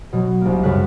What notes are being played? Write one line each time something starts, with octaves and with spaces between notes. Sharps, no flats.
B2 F#3
C2 A#3
F#2 C#3 G3 B4 F#6 B6